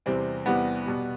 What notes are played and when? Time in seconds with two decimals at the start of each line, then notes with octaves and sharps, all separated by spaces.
0.06 E2 C3 E3 G3 C4
0.45 E2 C3 E3 G3 B3
0.86 B2 G3